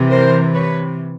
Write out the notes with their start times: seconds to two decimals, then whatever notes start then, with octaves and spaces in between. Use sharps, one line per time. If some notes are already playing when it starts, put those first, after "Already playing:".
Already playing: C3 E3
0.10 A#4 C5
0.53 B4 C#5